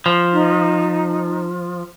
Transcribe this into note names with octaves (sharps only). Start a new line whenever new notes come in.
F3
D#4